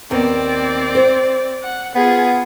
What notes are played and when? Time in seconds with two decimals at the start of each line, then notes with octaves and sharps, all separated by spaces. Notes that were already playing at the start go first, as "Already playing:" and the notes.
0.11 D#2 B3 C4 D5
0.95 C5
1.63 F#5
1.95 B3 F4 G#4